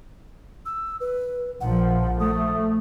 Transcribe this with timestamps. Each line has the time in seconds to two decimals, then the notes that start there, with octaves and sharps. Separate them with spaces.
0.65 E6
1.00 B4
1.61 A#1 A#2 F3 F#5
2.19 A3 D#6